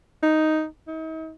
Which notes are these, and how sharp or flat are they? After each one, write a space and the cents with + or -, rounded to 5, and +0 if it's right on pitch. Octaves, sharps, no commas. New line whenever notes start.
D#4 +5
D#4 +45